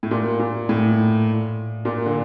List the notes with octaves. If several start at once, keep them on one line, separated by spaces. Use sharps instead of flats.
A2
A#2
A#2
A2
A#2
D3